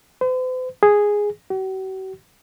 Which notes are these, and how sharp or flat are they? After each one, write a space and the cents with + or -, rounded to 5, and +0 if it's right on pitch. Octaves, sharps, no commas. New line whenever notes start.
C5 -45
G#4 -5
F#4 +45